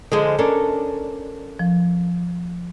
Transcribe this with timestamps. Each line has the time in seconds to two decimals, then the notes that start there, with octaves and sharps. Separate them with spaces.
0.12 D3 F3 G#3 D#5
0.39 C#4 D4 A4 A#4
1.59 F3